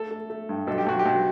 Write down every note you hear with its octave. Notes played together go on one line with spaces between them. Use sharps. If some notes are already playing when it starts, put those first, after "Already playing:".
Already playing: A3 A4
A3
A3
G2
B1 A4
G4
B1 F#4
G4
B1